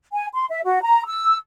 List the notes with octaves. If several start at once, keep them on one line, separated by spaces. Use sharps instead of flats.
G#5
C6
E5
F#4
A#5
E6